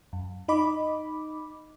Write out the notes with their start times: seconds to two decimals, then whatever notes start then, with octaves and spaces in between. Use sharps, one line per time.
0.13 F#2
0.48 D#4 D#5 B5 D6